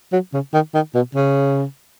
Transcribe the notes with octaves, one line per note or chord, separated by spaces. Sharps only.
F#3
C#3
D#3
D#3
B2
C#3